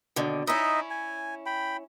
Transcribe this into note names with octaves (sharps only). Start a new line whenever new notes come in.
D#2 B2 D3
C#4 D#4 E4 D#5 E5
G#5
G5 B5